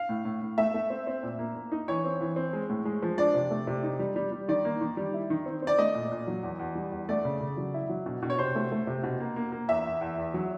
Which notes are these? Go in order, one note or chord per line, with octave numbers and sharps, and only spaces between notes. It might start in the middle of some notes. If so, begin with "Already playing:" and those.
Already playing: F5
A2
A2
A2
A3 E5
A3
C4
C4
A#2
A#3
A#3
D#4
E3 C#5
C4
E3
C4
G#3
A2
G#3
F3
D4 D5
C3
A3
C3
D#4
G3
G3
G3
D#3 D5
A#3
D#3
G3
E4
D#3
C4
C4 D5
A3 D#5
A#2
A#2
F#3
E2
E2
G3
E2
A3 D5
C#3
C#3
F#3
E4
F#3
B2
B2
C#5
C3 C5
A3
A3
C3
B2
A#3
A#3
A#3
E2 E5
E2
E2
E2
F#3